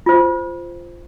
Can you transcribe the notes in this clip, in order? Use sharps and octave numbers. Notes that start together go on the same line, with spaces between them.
F4 C5